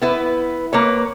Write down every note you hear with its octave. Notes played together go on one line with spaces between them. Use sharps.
B3 E4 B4
A#3 B4 C#5